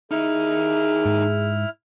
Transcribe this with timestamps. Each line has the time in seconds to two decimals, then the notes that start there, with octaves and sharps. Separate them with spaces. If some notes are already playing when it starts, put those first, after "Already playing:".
0.11 D#2 D#4 E4 G#4 F6
1.05 G#2